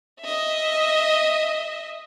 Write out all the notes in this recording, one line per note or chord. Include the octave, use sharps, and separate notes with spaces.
D#5 E5